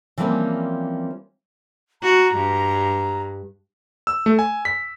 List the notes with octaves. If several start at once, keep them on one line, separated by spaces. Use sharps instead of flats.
E3 F3 G3 A#3 C4 C#4
F#4 A#5
G2
E6
A3
G#5
B6